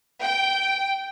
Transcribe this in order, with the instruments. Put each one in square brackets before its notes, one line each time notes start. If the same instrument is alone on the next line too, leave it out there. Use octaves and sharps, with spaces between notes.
[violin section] G5